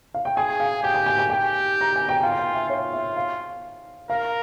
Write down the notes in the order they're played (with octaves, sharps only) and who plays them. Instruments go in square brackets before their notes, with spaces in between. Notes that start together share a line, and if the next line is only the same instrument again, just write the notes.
[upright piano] F5
G5
[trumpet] G#4 [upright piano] G#5
[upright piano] F5
[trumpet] G4 [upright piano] G5
[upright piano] G#5
G#5
G#5
[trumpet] G4 [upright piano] G5
[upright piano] A#5
G#5
G5
[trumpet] F4 [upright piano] F5
[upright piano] G#5
G5
E5
[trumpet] F4 [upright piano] C#5
[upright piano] E5
F5
[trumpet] A#4 [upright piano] F5